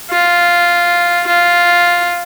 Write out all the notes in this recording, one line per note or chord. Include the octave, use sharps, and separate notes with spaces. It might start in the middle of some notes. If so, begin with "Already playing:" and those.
F4
F4